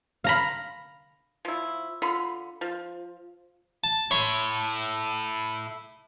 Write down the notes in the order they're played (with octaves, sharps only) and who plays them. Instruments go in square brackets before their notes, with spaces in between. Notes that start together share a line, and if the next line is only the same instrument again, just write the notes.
[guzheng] F5 A#5 B5
[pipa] F3 E4
D3 F4 B5
F3
[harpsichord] A5
[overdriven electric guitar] E4 A4 [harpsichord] C#5 C6